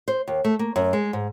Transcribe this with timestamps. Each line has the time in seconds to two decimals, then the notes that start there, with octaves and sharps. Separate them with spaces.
0.08 C5
0.28 D#2
0.44 A3
0.59 A#3
0.76 F#2
0.93 G#3
1.13 G#2